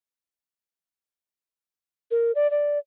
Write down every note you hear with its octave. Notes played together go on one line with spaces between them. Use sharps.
A#4
D5
D5